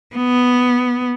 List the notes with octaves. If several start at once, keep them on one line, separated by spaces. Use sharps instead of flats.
B3